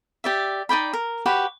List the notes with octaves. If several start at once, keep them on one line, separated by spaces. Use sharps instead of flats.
G4 D5 E5
D#4 D5 G5 B5
A#4
F#4 G4 B4